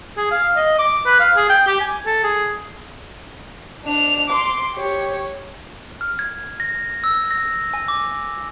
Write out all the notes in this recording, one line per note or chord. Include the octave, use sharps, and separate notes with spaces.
G#4
F5
D#5
D6
B4
F5
G#4
G5
G4
G#5
A4
G#4
D4 F7
C6 D6
G4 C#5
F6
G#6
A#6
E6
A#6
G#5
D6